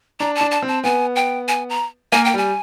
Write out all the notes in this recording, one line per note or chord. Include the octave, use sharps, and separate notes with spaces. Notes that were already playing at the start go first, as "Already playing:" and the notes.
D4 A#5
A5
D4
A5
C4
A5
B3 G#5
G5
G#5
A#5
A#3 G#5
G5
G3 G#5